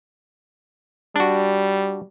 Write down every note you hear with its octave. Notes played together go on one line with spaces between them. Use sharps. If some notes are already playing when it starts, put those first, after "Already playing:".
G3 D4 F#4